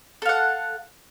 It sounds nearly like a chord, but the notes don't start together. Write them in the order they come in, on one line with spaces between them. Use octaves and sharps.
A4 F5 F#5